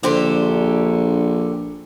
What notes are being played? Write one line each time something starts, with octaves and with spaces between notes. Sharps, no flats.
A#1 D3 G4 C5